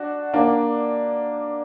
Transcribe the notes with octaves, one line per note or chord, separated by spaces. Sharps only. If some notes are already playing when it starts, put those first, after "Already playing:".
Already playing: D4 F#4
A#3 D4